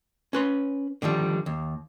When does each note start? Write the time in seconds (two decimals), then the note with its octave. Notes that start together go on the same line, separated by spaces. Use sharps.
0.33 C#4 B4 C6
1.02 D3 D#3 F3 G3
1.46 D#2